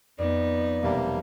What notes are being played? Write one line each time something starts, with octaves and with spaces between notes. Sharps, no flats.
F2 B3 D#4 D5
E1 C3 F#3 G3 A#3 A5